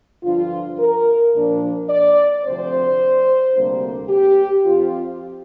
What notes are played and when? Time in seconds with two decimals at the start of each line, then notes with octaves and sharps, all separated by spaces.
0.23 G2 D3 F3 D4 F4
0.78 A#4
1.33 A#2 F3 D4
1.89 D5
2.44 D2 C3 F3 C4 C5
3.54 D2 C3 G3 A#3 D4
4.09 G4
4.64 F2 F3 C4 F4